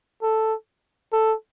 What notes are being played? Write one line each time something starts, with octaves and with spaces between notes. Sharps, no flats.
A4
A4